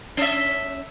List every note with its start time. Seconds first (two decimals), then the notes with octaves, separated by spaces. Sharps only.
0.17 C#4 E5